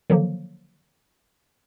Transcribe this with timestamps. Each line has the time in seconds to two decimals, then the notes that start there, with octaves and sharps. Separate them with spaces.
0.10 D3 D#3 F3 F#3 A#3